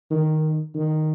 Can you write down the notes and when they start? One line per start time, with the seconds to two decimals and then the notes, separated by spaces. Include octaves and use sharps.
0.11 D#3
0.74 D#3